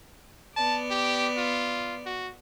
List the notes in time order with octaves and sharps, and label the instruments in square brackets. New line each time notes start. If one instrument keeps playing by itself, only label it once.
[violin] B3 D5 [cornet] A5
[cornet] G4
F4
F#4